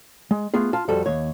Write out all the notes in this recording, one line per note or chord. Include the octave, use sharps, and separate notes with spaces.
G#3
A3 B3 F4 G#4
F4 A5
F2 G3 F#4 A4
D#2 C#5